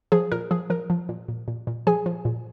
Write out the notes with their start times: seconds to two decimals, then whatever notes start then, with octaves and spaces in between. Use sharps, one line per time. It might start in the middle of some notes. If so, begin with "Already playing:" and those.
0.12 F3 G#4
0.32 A#2 A#4
0.51 F3 G#4
0.70 F3 A#4
0.90 F3
1.09 A#2
1.28 A#2
1.48 A#2
1.67 A#2
1.87 F3 G#4 G#5
2.06 F3
2.25 A#2